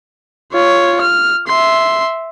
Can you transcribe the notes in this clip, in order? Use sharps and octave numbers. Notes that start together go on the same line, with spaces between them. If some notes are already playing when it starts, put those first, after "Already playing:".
F4 C#5
F6
E5 C6